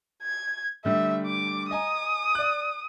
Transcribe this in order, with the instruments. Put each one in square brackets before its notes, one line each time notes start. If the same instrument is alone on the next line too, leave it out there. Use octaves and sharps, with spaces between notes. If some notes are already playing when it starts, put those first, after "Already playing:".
[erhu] G#6
[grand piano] D3 G3 A3 [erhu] E5
[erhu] D6
[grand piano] D#5 G#5 A#5 [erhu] D#6
[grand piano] D5 F#6